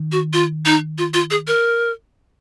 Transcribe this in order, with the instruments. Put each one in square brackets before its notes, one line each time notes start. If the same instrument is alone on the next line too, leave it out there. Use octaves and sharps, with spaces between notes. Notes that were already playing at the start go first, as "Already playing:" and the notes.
Already playing: [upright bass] D#3
[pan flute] F#4
F4
D#4
F4
F4
G#4
A#4